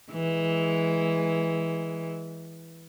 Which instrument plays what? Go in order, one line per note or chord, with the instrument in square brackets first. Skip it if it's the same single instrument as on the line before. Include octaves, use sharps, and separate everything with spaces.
[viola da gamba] E3 G#3